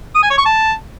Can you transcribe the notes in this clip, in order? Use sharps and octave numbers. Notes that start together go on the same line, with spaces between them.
D#6
G#5
C#5
C#6
A5